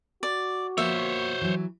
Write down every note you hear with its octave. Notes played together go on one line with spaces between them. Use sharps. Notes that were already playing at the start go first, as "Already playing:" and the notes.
F#4 D5
F3 A#3 B3 C5 C#5 E5
E3 F#3